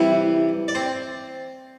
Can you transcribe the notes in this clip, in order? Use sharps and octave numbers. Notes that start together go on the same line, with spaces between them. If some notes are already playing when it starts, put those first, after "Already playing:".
Already playing: C3 E3 G3 E4 E5
D5
C4 C5